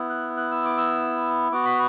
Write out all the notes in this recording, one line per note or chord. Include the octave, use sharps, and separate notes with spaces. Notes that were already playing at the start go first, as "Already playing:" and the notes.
Already playing: B3 E4
F#6
F#6
E6
D6
E6
B3 F#4 D6
B5